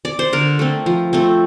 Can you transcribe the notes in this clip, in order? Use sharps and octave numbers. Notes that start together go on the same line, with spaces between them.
D5
C5
D3 A#4
A3 C4
F3
A3 C4